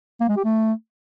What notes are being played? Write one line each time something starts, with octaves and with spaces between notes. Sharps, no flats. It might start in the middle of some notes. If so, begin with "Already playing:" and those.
A#3
G#3
G4
A3